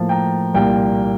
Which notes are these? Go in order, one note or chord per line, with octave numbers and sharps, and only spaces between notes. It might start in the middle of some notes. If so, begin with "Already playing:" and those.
Already playing: A2 F3 A#3 A5
G5 A#5
C2 A#2 G3 A#3 G5 A#5